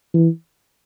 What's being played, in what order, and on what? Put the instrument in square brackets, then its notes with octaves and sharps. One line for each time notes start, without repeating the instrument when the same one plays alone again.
[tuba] E3